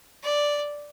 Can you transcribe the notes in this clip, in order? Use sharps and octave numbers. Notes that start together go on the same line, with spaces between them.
D5